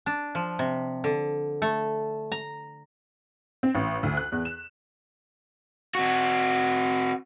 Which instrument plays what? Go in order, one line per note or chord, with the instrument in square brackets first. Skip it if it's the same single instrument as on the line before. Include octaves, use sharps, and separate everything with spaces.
[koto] D4
F3
C3
D3
A3
A#5
[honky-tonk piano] C4
A1
D2
F#6
E2
E7
[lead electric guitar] C4 F#4